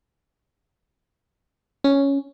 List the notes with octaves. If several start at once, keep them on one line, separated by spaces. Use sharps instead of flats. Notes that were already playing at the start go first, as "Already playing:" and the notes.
C#4